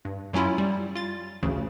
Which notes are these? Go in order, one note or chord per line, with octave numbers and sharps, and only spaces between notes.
G2
F#2 F#3 C#4 E4 F4
G3
F4 A6
A1 D2 C#3